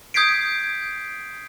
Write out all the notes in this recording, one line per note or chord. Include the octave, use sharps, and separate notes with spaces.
D#6 G6 G#6 B6 C7 D7